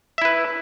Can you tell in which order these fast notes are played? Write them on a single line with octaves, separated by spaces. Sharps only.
E5 E4 B4